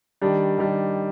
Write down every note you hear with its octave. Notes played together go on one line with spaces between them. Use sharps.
D#3 G3 D4
D#3 G3 D4